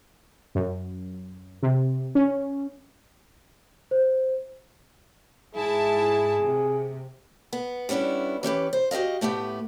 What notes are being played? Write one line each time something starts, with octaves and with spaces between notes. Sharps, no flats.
F#2
C3
C#4
C5
G#2 E4 G#4 A5
C3
B3
G3 B3 C#4 D4 E4
E3 C#4 G4 B4
C5
F#4 G4 A4 D#5 F5
A2 A3 B3 G4